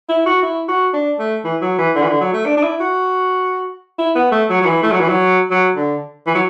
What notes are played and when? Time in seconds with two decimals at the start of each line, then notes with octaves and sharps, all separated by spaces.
0.09 E4
0.26 F#4
0.42 E4
0.68 F#4
0.93 D4
1.19 A3
1.44 E3
1.61 F#3
1.78 E3
1.95 D3
2.02 E3
2.08 D3
2.21 F#3
2.33 A3
2.46 D4
2.57 D4
2.63 E4
2.80 F#4
3.98 E4
4.15 B3
4.31 A3
4.49 F#3
4.61 F#3
4.66 E3
4.83 A3
4.91 F#3
5.00 E3
5.09 F#3
5.51 F#3
5.76 D3
6.27 E3
6.35 F#3